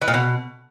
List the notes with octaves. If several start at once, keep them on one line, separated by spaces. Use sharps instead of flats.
E3
A#2
B2